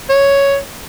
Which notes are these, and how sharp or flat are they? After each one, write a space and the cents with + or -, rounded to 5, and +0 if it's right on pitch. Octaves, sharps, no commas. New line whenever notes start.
C#5 +5